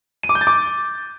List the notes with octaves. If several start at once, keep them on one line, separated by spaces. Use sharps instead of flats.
D#7
D6
G6
A6
D6